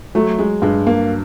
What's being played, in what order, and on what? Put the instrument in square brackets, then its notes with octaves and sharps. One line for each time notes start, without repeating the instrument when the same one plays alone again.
[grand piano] F#3 [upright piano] A3
[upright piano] G#3
[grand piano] G2 [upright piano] G#3
[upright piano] A#3